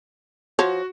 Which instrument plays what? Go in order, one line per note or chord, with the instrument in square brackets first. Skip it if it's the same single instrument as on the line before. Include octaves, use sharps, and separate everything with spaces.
[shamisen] F3 C#5 [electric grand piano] F#4